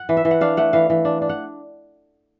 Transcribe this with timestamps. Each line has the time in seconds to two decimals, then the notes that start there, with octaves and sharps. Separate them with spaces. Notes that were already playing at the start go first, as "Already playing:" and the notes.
Already playing: F#5
0.09 E3
0.17 E5
0.25 E3
0.31 F#5
0.41 D4 F5
0.57 A3 F#5
0.73 E3 F5
0.90 E3
1.05 D4
1.22 D4
1.29 F#5